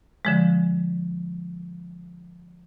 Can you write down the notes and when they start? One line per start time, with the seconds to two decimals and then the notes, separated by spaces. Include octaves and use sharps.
0.25 D3 F3 G#3